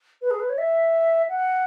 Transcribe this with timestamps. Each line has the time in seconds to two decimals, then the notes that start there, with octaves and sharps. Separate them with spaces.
0.21 B4
0.30 G#4
0.39 B4
0.49 C#5
0.57 E5
1.29 F#5